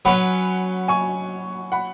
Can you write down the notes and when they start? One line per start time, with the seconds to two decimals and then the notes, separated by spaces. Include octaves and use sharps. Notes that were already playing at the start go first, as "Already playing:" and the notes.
0.05 F#3 C#4 B4 F#5 B5
0.88 G#5 C#6
1.72 F#5 B5